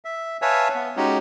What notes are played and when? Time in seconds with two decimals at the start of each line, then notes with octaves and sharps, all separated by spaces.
0.05 E5
0.42 B4 C#5 E5 F5 G#5 A5
0.75 B3
0.97 G#3 C#4 D#4 F#4 G4